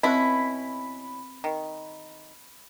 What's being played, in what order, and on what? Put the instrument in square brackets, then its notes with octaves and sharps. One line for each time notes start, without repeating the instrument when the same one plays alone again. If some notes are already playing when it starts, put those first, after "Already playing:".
[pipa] B2 C#4 E4 [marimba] C4 F#6 [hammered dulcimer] B5
[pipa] D#3